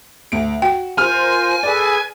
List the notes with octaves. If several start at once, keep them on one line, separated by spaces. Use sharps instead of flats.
D2 D7
F#4 G5
F4 A#4 C5 G#5 F6
G#4 A4 B4 D5